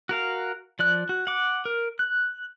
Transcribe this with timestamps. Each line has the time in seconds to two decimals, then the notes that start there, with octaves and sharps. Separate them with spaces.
0.09 F#4 A#4 F5
0.79 F3 D5 F#6
1.09 F#4
1.27 F#5 D6
1.65 A#4
1.99 F#6